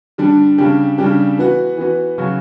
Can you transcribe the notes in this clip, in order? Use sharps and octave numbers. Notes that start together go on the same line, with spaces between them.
D3 G3 D4
C#3 G3 D4 G4
C#3 G3 D4 G4
E3 B3 F#4
E3 B3 F#4
C#3 F#3 C#4 F#4